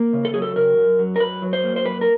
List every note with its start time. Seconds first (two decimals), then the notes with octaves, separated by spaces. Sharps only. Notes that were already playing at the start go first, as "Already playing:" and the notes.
Already playing: A#3
0.13 C#3
0.25 A4
0.34 F#3 G#4
0.42 A4
0.56 C#3 A#4
0.77 F#2
0.99 F#3
1.16 A#4
1.20 F#2 B4
1.42 F#3
1.53 C5
1.64 A#3
1.76 C5
1.85 F#2 B4
2.01 A#4